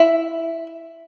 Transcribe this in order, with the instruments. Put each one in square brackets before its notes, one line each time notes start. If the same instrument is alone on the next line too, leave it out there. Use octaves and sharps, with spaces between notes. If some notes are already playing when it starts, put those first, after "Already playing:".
Already playing: [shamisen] E4